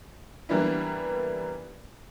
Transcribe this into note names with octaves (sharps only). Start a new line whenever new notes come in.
E3 G3 A#3 B3 D4 E4